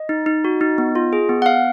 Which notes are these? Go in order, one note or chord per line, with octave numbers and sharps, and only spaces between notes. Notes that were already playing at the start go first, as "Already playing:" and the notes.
Already playing: D#5
D#4
D#4
F#4
D#4
B3
F4
G#4
B3
F#5
B3 F5